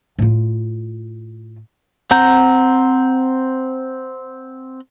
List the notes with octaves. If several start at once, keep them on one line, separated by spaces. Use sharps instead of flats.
A2 F4
C4 F#5 A#5 G6